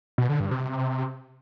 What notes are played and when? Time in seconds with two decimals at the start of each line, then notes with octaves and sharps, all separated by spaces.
0.18 B2
0.29 D3
0.40 G2
0.51 C3